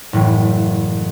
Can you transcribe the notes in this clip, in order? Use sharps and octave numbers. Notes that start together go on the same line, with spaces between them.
F#1 A2 E3